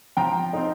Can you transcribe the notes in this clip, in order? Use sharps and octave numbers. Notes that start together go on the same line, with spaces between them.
F3 G5 A#5
C4 D#4